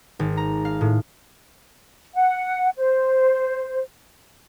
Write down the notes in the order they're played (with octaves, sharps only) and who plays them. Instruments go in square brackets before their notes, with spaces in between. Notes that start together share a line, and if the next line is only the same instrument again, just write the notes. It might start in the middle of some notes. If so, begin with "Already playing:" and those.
[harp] G#1
A#5
F5
A2
[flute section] F#5
C5